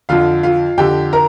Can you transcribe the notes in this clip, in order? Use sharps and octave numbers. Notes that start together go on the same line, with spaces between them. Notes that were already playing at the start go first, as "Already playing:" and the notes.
F2 D3 F4 F5
F4 F5
F2 D3 G4 G5
A#4 A#5